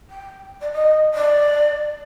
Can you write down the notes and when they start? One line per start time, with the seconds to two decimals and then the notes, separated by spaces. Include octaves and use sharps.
0.10 G5
0.61 D5
0.72 D#5
1.14 D5